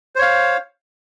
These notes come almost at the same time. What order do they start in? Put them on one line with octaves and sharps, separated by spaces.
C5 C#5 F5